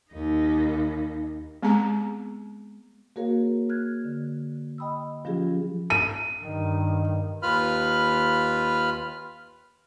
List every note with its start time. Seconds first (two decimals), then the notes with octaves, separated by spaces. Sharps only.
0.11 D#2 D#4
1.63 G#3 B3 C4 G#4 A#5
3.16 A#3 F#4 G#4 A#4 C#5 F5
3.70 F6 F#6 G#6
4.05 D3
4.78 D#5 G5 B5 D#6 E6
5.25 F3 F#3 C#4 F4 G4 G#4
5.90 D#7
6.40 G2 D#3
7.42 D#2 F4 B4 B5 F6